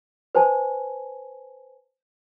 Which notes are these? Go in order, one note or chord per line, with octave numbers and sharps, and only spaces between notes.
B4 C5 G#5 A5